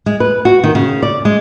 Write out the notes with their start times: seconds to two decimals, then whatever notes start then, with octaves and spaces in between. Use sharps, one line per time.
0.06 G#3
0.20 B4
0.45 F#4
0.64 D#3
0.75 C#3
1.03 D5
1.25 G#3